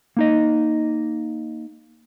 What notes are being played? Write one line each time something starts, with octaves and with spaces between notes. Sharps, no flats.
A#3 D#4 D#5